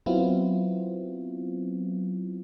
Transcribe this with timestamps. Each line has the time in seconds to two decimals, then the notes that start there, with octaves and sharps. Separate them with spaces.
0.06 F#3 B3 C4 E4 F4